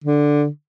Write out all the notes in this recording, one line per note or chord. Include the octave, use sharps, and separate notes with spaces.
D3